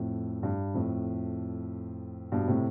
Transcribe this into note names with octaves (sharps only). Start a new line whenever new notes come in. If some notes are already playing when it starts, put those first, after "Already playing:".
Already playing: F2 A2
G2
F2 A2
G2 B2
A2 C3